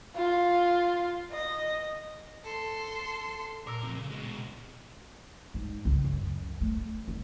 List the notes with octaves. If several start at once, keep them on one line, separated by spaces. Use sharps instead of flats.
F4
D#5
A4 C6
A#2 A#4 E6
F2 C3
C#3
B2 G#3
G#2
C#2
F#2
A3
F1